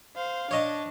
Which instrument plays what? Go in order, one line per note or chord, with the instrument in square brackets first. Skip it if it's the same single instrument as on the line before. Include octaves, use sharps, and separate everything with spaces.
[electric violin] C5 F5
[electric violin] D4 [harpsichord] C#5 D#5 A5